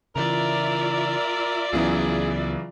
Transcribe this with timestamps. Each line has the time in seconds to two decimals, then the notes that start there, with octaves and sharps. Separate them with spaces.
0.16 C#3 E3 F4 A#4 D5 E5
1.73 C#2 C#3 E3 F#3 B3 G#4